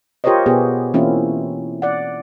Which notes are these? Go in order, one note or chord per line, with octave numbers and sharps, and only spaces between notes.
F4 G4 A#4 C5 C#5 D#5
B2 B3 G4 G#4
E3 A#3 C4 C#4 E4 F4
D5 F#5